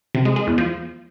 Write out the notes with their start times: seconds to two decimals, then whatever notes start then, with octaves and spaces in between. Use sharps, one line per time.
0.15 C3
0.25 G#3
0.36 G#3
0.47 E2
0.58 F3